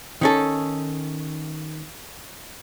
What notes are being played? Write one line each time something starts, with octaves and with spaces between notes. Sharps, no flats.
D#3 C#4 A4